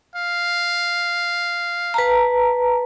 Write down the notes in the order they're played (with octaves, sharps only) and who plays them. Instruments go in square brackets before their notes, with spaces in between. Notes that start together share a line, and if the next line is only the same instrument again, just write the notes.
[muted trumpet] F5
[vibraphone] B4 A5 A#5